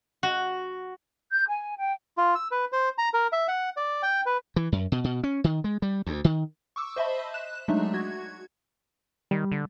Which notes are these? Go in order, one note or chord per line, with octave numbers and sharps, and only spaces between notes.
F#4
G6
G#5
G5
F4
E6
B4
C5
A#5
A#4
E5
F#5
D5
G5
B4
E3
F#2
B2
B2
C#4
D#3
G#3
G3
D2
D#3
C#6 D6 E6
C5 D#5 E5 A5 B5
F#6 E7
F#3 G#3 A3 D4 D#4 E5
F#4 G#6
D#3 G3
D3